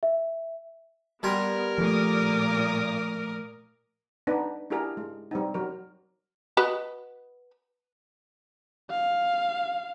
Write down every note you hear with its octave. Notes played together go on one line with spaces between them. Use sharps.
E5
G3 B3 A#4 G#5 C6
A#2 F3 A3 D6 D#6
B3 D4 D#4 B4
D4 E4 G4 G#4 A#4
G#3
G3 C4 D#4
F#3 A#4
F#4 B4 D#5
F5